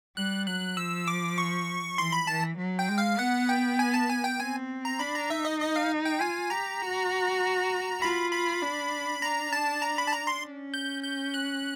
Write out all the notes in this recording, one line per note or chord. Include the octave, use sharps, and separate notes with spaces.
G3 F#6
F#3 F#6
F3 E6
D6
C#6
E3 C6
B5
E3 A5
F#3
G5
G#3
F5
B3 F#5
G5
G#5
A5
G#5
G5
C4 G#5
A#5
D4 B5
A#5
D#4 E5
D#5
D#5
F5
G5
F4 G#5
G4 A#5
F#4
F4 B5
B5
D4
D4 A#5
A5
A#5
B5
A5
A#5
C6
C#4
G6
G6
F#6